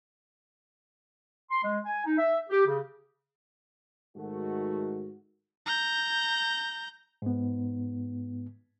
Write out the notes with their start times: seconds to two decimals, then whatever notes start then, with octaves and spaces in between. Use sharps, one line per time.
1.51 C6
1.63 G#3
1.86 G#5
2.05 D#4
2.19 E5
2.50 G4
2.66 C#3
4.16 G#2 D#3 A3 F#4
5.66 A#5 G6
7.22 G#2 B3